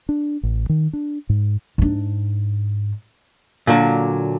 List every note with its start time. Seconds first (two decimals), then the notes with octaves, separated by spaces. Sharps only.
0.09 D4
0.43 A1
0.69 D#3
0.93 D4
1.29 G#2
1.78 G#2 D4
3.67 A#2 D3 F#3